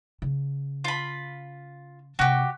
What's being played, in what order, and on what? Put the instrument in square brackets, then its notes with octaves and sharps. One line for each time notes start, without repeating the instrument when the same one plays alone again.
[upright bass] C#3
[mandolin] F4 B5
[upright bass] C3 [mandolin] F#4 G4